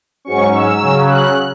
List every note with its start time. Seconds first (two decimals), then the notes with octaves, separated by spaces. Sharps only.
0.25 G#2 F#3 C#4 C#6
0.52 E6
0.80 C#3 F#3 C#4
1.09 F#6